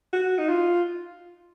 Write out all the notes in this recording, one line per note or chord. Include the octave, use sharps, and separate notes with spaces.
F#4
D#4
F4